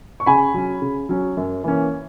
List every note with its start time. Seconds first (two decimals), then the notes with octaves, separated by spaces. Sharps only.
0.20 C#6
0.26 C#3 G#5 B5
0.54 F#3 C#4
0.82 C#3
1.09 F#3 C#4
1.37 F#2
1.64 E3 A#3 C#4